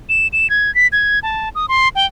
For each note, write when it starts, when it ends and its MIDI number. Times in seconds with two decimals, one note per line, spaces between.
0.09 0.27 100
0.33 0.49 100
0.50 0.73 92
0.75 0.87 95
0.92 1.19 92
1.23 1.49 81
1.55 1.66 87
1.69 1.89 84
1.95 2.06 79